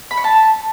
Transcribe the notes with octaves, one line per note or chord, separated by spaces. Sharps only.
B5
C#5
A5